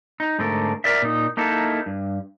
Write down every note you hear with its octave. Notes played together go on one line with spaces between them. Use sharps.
D#4
G#2 D3 A3 A4 A#4
A#4 D5 E5
A#2 D#4
A#3 D#4 E4 A4
G2